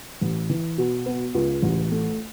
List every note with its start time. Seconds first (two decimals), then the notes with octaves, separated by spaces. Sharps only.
0.21 A1
0.50 E3
0.78 B2
1.06 B3
1.34 C#2
1.62 A1
1.91 A3